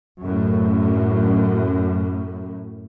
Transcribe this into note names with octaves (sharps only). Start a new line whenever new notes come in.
F#2 A2